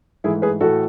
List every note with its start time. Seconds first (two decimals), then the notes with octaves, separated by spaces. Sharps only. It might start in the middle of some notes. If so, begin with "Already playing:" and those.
0.24 G#2 E3 A3 E4 G#4
0.42 G#4 B4
0.60 A2 E3 A3 F#4 A4